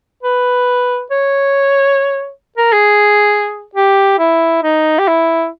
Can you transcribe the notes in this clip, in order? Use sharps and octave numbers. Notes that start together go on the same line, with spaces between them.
B4
C#5
A#4
G#4
G4
E4
D#4
G4
E4